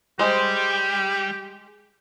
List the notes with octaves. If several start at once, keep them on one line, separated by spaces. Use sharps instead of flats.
G3 G#3 G4 C5